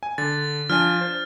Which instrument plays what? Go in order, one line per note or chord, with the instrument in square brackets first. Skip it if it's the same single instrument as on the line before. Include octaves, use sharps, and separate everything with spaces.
[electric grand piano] G#5
[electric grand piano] D3 [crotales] A6
[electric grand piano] F3 D4 G#5 [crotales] F6
[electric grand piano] C5